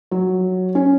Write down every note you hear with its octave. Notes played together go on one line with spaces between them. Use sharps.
F#3
C#4